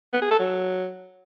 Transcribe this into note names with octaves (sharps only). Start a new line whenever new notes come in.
B3
G#4
A4
F#3